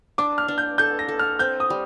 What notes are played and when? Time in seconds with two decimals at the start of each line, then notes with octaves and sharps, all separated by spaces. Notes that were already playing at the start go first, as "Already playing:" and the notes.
0.18 D4 D6
0.38 F6
0.48 D4
0.58 G6
0.78 A4 G6
0.99 A#6
1.08 A4
1.19 F6
1.39 C4 G6
1.60 D#6
1.70 G3